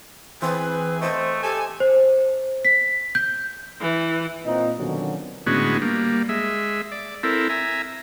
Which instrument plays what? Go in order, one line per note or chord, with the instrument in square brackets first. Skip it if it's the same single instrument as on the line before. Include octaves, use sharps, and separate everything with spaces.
[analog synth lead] E3 [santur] C4 [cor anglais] G#4 [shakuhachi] B4
[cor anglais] A3 [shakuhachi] C5 [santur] D#5 D#6
[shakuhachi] G4 [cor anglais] A4 [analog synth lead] G#5
[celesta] C5
B6
G6
[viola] E3
[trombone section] A#2 C4 D#4
B2 D3 D#3 F3 F#3 C#4
[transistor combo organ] A2 D3 G#3 B3 C#4 F#4
G3 A#3
G#3 E5
D5
C4 E4 A4 A#4
E5 G#5 A#5